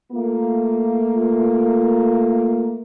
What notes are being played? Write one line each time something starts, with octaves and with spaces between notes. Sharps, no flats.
A3 A#3 F4